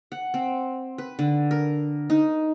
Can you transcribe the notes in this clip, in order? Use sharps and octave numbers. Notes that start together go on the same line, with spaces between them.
F#5
C4
B4
D3
A#4
D#4